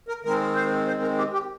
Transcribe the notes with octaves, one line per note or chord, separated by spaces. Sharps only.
A#4
D#3 G#3 C4 A#4
C5
C5
A#4
G4
G4